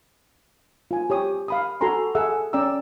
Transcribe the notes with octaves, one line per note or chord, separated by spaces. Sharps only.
F4 G#5
G4 C#5 D#6
F5 B5 D#6
F#4 A4 G#5 A#5 C6
G#4 A4 E5 F#5 E6
C#4 D5 G5 A#5 E6